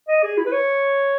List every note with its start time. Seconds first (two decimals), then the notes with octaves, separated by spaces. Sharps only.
0.08 D#5
0.23 G#4
0.38 E4
0.46 B4
0.52 C#5